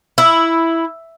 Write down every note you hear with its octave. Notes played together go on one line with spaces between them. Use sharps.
E4